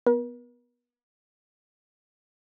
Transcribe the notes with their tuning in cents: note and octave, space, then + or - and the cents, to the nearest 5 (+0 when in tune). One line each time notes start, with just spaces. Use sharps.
B3 -5 A#4 +45